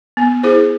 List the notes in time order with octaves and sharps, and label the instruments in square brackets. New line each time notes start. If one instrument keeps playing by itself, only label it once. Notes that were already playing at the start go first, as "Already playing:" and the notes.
[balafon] B3
E4 G#4 C5